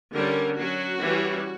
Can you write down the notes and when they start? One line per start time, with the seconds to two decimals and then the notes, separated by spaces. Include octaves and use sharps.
0.13 D3 G3 C#4 A#4
0.57 F#3 C#4 F#4
1.01 E3 G3 C#4